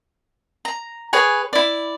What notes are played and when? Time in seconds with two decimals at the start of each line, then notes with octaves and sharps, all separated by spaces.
0.65 A#5
1.13 G#4 B4 C#5 G#5
1.53 E4 D5